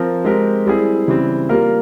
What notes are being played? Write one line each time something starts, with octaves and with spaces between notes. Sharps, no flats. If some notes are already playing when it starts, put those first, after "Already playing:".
Already playing: F3 C4 F4 A#4
G#3 C4 G4 A#4
G3 C4 E4 G#4
C#3 E3 G3 C4
G3 A#3 F4 A#4